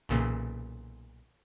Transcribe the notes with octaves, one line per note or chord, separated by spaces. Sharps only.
B1 A#2 C#3 E3